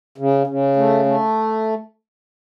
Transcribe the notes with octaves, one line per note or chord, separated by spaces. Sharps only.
C#3
C#3
A3
A3